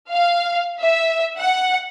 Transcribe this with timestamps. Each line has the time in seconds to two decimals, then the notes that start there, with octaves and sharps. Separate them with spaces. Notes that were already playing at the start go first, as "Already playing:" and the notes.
0.11 F5
0.80 E5
1.38 F#5